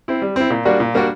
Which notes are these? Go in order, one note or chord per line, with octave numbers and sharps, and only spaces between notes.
C4 E4
G3
C4 E4
A#2
G3 A#3 D4 F#4
A#2
G3 A#3 D4 F#4